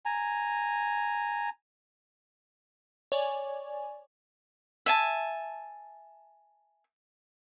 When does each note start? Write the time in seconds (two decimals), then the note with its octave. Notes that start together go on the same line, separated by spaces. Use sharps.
0.05 G#5 A#5
3.12 C#5 D5 G#5
4.86 E5 G#5 A5